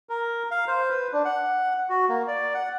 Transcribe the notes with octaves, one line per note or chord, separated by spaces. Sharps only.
A#4
F5
C5
B4
D4
F#5
F#4
A#3
D5
F#5